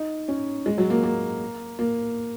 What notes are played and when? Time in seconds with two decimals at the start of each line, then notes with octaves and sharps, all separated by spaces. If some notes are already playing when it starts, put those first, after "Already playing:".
Already playing: D#4
0.28 C#4
0.66 G#3
0.78 F#3
0.90 A#3
1.03 A#3
1.79 A#3